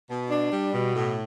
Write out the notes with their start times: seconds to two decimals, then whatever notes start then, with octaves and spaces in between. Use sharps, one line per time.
0.09 B2
0.30 D4
0.52 G3
0.73 B2
0.95 A2